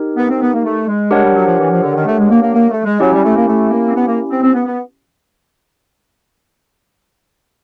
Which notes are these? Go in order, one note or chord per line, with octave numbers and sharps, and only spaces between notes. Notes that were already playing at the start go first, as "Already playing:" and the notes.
Already playing: D#4 G4 A#4
B3
C4
B3
A#3
A3
G#3
G#3 D4 G4 A#4 C#5 F#5
G3
F#3
F3
E3
F3
D3
D#3
A3
G#3
A#3
A#3
A#3
A3
G#3
F#3 C#4 E4 G4
G3
A3
A#3
A3
A#3
C4
B3
A#3
C4
C4
B3
B3